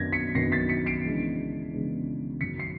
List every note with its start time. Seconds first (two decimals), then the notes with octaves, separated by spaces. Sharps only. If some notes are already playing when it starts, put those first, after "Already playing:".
Already playing: F#2 D#3 F#3 B3 D4 G#6 A#6
0.12 B6 C#7
0.35 F#2 D#3 F#3 B3 D4 A#6 C7
0.52 A6 B6
0.69 B6 C#7
0.86 C7 D7
1.04 C#3 E3 G#3 B3 D4
1.72 C#3 E3 G#3 B3 D4
2.41 F#2 D#3 F#3 B6 C#7
2.60 C7